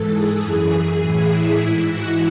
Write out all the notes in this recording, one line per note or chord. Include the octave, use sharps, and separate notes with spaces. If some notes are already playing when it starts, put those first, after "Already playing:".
Already playing: G#2 E3 A4
G#4
F#2 E3
A2 E3
E4
G#2 E3
F#4